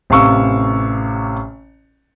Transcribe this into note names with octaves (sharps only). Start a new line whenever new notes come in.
A1 C3 F5 C#6 E6